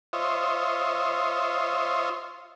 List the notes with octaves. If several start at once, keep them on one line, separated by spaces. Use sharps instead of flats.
F4 C5 C#5 D#5 E5